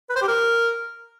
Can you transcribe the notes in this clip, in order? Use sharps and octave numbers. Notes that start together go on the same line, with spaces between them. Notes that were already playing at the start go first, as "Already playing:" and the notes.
B4
C5
G4
A#4